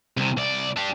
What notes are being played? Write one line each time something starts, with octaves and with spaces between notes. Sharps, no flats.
C2 C3
C2 D5
D4 G4